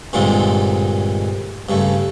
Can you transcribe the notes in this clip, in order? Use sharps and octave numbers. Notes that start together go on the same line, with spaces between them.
G2 A#2 D3 D#3 G#3 C4
G2 C#3 A3